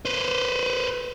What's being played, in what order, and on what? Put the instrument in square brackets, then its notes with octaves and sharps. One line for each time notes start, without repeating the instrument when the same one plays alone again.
[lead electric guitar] B4 C5